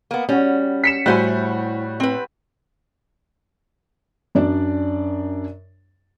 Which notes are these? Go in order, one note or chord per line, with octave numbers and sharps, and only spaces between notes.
A#3 B3
G3 C#4 F#4
B6 C#7 E7
A2 G3 E4 F#4 C5 G#5
C4 B4
F#2 D4 D5